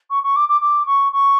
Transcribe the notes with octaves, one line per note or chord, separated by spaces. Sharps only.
C#6
C#6
D6
D6
D6
C#6
C#6